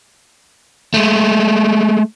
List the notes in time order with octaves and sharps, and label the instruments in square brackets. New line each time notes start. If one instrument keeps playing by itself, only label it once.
[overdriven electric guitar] G#3 A3